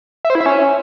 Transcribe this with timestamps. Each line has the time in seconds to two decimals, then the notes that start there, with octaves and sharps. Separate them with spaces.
0.25 E5
0.30 C5
0.35 E4
0.41 E5
0.46 C#4